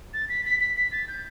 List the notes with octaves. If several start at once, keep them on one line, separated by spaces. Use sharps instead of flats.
A6
B6
B6
B6
B6
A6
G6